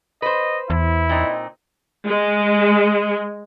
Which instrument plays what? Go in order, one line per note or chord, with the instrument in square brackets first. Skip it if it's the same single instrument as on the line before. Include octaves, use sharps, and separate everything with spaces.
[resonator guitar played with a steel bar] B4 C5 [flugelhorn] D#5
[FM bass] E2 [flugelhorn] E4
[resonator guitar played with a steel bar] A#2 C4 D#4
[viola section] G#3